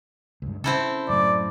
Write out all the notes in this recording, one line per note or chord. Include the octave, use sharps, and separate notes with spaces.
C#2 G2
C#3 C4 E4 A4
F#2 A2 D5